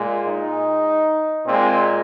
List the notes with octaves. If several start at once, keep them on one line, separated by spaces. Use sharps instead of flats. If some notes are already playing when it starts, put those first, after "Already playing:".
Already playing: A#2 G#3
D#4
A#2 G#3 C4